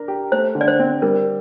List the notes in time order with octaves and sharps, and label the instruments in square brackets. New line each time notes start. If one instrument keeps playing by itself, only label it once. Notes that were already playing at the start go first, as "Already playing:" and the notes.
Already playing: [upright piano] D4 A#4
G4
[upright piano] A3 [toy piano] C5
[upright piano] D3
[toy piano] D5
C5
[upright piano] C4
[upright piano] G3 [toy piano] A#4